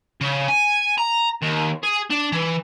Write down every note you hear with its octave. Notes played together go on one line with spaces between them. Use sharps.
C#3
G#5
A#5
D#2
G#4
D4
E3